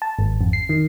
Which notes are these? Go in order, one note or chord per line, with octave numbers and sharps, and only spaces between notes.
A5
G#1
F2
C7
D#3